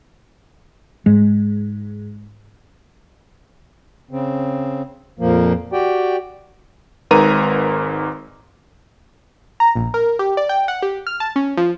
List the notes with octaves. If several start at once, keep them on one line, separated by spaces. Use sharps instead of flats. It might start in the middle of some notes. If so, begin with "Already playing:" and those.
G#2 G#3
C#3 C4
F2 A#2 F3 A#3
F#4 G4 D5 G5
G#1 G#2 A#4 B4 A#5 D#7
A#5
A#1
A#4
G4
D5
G5
F#5
G4
F6
A5
C#4
F3